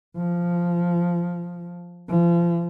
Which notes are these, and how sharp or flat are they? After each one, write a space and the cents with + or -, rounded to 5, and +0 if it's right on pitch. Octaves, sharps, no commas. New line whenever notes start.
F3 -5
F3 -35